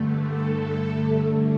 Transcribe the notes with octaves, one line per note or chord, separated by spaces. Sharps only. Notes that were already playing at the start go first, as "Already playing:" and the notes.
Already playing: G2 D3 A3
A4